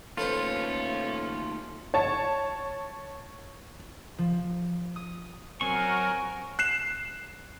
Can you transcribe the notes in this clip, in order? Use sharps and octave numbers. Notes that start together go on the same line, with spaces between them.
D#2 A3 C#4 F4 A4 B4 C5
C#5 A5
F3
D#6
F#3 C4 F#4 A#4 G#5 C#6
F#6 C7 E7